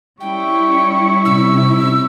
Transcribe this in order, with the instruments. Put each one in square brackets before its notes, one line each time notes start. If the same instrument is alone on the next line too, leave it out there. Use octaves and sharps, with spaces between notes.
[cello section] G3 C#4 E4 [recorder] G5 [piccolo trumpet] C#6
[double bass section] C3 [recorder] E6